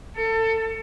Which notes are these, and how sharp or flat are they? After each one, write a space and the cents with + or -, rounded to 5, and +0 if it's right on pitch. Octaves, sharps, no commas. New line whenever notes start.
A4 +30